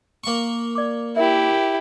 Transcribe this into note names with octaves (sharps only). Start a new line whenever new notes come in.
A#3 C#6
D5 D6
E4 G4 A#4 E5